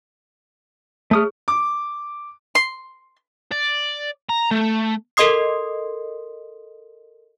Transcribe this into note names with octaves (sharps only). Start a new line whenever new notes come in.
A3 G#4 C#5 D#6 F6
D6
C6
D5
A#5
A3
A4 A#4 D#5 C6 D#6 C7